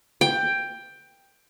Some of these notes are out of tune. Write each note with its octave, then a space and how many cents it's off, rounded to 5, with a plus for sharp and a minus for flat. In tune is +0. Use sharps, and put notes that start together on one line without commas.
G5 +10